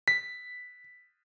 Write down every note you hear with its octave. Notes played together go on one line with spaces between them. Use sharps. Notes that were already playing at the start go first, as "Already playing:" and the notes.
B6